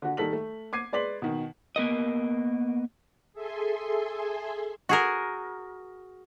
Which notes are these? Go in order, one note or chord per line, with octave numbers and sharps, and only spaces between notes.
D3 F#4
D#3 G3 A4 B6 F#7
A3
D6 G#6 C7 D#7
G#3 B4 D5 C6 B6 F#7
B2 D#3
A#3 B3 A#4 D#5
G#4 A4 E5 G#5 C6
F#4 G#4 A#4